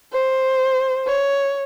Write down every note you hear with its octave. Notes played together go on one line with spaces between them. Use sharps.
C5
C#5